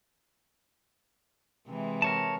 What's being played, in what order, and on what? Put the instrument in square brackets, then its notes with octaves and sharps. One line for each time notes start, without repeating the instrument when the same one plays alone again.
[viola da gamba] C3 E3 G#3
[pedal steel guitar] A#4 C#5 A5